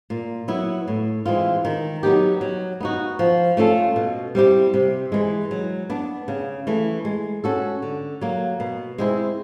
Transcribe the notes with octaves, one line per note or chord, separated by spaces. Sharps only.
A#2
F#3 B3 E4
A2
E3 G#3 C4 F4
D#3
F#3 B3 D#4 G4
F#3
B3 D#4 F#4
F3
A3 C#4 F4 A4
B2
G3 C4 E4 G4
C3
E3 G#3
F#3
B3 D4
C#3
E3 A3
G#3
C#4 F#4 A4
D3
F#3 A#3
B2
G#3 C4 E4